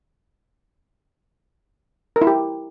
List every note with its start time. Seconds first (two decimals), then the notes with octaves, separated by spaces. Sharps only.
2.16 A#4
2.22 E4
2.27 G4